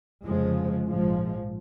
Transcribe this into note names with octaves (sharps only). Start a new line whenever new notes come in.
F1 F2 C#3 F3 G#3
A#1 G#2 F3 G#3